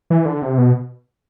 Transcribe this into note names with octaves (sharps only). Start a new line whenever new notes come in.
E3
D3
C3
B2